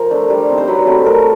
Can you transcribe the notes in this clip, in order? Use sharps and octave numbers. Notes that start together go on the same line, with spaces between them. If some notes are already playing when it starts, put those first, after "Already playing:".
Already playing: F3 A#4 C5
A3 D4
G3
C4 D#4
C5
F#3 B4
A3 C4
A3 A#4